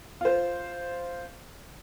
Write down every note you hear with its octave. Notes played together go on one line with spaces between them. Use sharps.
F4 C5